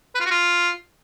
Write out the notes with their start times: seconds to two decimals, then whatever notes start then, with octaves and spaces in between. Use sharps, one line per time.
0.15 B4
0.20 F4
0.26 F#4
0.31 F4